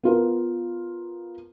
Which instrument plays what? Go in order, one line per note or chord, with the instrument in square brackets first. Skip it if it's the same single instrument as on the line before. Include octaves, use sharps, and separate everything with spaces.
[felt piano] B3 F4 A#4